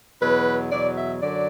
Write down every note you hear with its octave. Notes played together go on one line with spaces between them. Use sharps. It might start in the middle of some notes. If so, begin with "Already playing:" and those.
E2 B2 F#3 B4
E2 B2 F#3 D5
E5
F#2 D3 F#3 D5